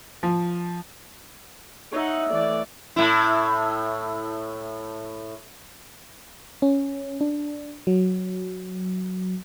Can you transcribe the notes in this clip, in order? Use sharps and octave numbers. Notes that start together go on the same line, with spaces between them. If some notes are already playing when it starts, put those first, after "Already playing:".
F3
D#4 C#5 E5 F#5
E3 A3 D5
A2 E4
C#4
D4
F#3